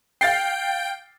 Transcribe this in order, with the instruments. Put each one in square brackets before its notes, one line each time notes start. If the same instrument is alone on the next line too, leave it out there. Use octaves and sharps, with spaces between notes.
[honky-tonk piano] F5 A6 C7 [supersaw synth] G5